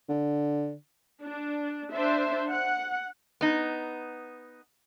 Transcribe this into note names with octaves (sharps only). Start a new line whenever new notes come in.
D3
D4
D4 C5 E5
F#5
B3 D#4